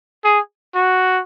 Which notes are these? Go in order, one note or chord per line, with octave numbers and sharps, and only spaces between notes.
G#4
F#4